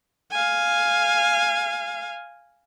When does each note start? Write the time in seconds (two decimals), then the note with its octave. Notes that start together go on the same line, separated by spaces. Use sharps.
0.31 F5 G#5